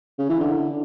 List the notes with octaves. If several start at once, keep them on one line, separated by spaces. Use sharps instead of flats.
C#3
E3
D3